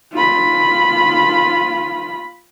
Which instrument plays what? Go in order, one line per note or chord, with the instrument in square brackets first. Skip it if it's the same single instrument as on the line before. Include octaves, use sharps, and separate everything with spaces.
[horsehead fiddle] F4 B5